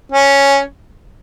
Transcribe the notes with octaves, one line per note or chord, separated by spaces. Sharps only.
C#4